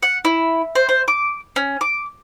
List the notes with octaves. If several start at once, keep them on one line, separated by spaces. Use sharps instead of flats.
F#5
E4
C5
C5
D6
C#4
D6